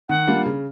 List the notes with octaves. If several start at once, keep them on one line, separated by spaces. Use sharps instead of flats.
D#3 F#5
G3 A#3 D4 F4
C#3